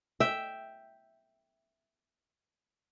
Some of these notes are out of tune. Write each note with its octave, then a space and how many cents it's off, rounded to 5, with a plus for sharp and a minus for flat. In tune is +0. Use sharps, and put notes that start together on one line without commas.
E5 +0 G5 +0